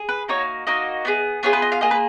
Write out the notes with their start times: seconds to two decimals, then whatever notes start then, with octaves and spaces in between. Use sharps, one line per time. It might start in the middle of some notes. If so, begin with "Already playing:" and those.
Already playing: G#4
0.09 B4
0.28 A#3 D#4 F#4 C#5
0.67 A#3 D#4 F#4 D#5
1.05 B3 F4 G#4
1.43 B3 F4 G#4 C#5
1.53 B4
1.62 D#5
1.72 F5
1.81 A#3 F4 G#4 D#5
1.91 B4